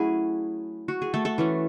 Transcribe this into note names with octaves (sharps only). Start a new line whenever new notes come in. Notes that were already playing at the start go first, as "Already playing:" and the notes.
Already playing: F#3 A3 C#4 E4 F#4 G#4
F#4
G#4
A3 A4
A3 A4
E3 A3 C#4